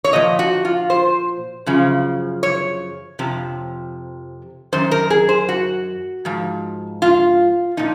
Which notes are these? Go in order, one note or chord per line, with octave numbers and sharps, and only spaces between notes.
C#5
A#2 F3 D#5
F#4
F4
C5
F#2 C#3 F3
C#5
F2 C3 F3
F#2 D#3 C5
A#4
G#4
C5
F#4
G#2 F3
F4
A#2 F3 D#4